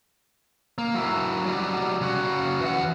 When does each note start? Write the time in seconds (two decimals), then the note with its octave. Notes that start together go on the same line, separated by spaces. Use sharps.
0.78 A#3
0.95 F#3 E4
1.46 F#3 G3
2.01 C#3 F#4
2.61 E3 F#5